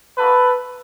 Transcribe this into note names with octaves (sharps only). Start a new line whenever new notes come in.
A#3 D#4 F#4 A4 B4